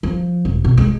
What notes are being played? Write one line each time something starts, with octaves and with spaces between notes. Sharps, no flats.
F3
E1
B2
G#3